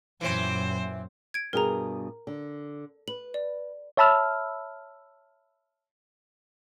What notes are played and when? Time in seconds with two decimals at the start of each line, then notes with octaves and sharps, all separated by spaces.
0.21 F#2 A#2 E3 C4 C5
1.34 G#6 D7
1.53 G2 B2 G#4 A#4 A#5
2.27 D3
3.08 B4 F#7
3.34 D5
3.97 C#5 E5 A5 B5 E6 F6